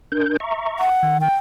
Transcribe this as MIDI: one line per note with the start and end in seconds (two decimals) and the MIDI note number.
0.12 0.37 62
0.12 0.37 70
0.12 0.37 91
0.40 0.89 76
0.40 0.89 82
0.40 0.89 85
0.79 1.18 78
1.03 1.28 51
1.21 1.36 79